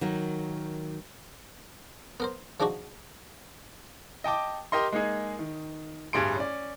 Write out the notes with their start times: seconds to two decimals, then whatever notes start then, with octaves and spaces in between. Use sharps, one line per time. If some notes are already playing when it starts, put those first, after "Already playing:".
0.01 D#3 F#3 A#3
2.20 B3 A#4 C5
2.60 F3 G#3 D4 D#4 F#4
4.24 D#5 G5 A5 D6
4.72 G4 A#4 D#5 C6
4.92 G#3 A#3 D#4 G#4
5.39 D#3
6.13 D1 G2 G3 G#4 C6 D7
6.36 C#4 D5